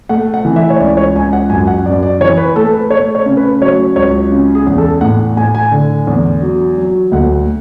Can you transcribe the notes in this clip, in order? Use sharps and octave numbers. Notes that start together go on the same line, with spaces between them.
A3 F#5
F#5
E3
E5
C#5
C#2 D5
C#5
C#2 G#5
F#5
F#2 G#5
F#5
F#2 D5
D5
E3 C#5
B4
A3 A4
B4
A3 C#5
C#5
C#3
B4
F#3 C#5
C#2 C#5
C#3
G#4
E2
A4
A2 F#5
A2 G#5
G#5
D3
E2
F#3
F#3
D2 F#5